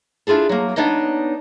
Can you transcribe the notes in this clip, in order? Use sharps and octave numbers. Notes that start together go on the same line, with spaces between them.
D4 E4 F4 G#4 A4
F#3 A#3
B3 D4 D#4 C#5 D#5